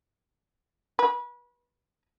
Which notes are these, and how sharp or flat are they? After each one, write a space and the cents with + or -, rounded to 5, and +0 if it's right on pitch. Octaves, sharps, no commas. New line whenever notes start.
B4 -30